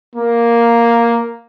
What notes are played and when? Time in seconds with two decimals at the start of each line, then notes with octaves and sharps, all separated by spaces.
0.16 A#3